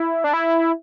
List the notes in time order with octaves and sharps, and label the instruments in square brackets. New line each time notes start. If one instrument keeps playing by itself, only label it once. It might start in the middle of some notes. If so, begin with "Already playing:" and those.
Already playing: [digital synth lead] E4
D4
E4